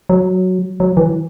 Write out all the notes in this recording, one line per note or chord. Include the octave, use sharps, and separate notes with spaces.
F#3
F#3
E3